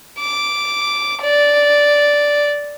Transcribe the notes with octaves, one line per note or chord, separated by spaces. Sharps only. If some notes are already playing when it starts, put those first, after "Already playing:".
D6
D5